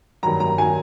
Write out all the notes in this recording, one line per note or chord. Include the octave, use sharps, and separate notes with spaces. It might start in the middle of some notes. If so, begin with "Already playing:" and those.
G2 D#3 F#3 A#5
A#5
D#3 F#3 G#5